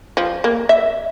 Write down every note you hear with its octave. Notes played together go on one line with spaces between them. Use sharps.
F3
A#3
E5